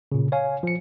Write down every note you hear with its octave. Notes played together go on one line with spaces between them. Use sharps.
A#2 C#3
C#5 F5 G#5
F3 C#7